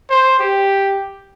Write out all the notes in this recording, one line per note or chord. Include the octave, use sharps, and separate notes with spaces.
C5
G4